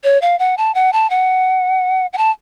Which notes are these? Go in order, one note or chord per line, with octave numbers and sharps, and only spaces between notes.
C#5
F5
F#5
A5
F#5
A5
F#5
F#5
A5